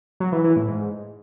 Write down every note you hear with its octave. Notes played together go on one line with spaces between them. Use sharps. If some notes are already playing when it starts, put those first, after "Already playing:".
F#3
E3
E3
A2
G#2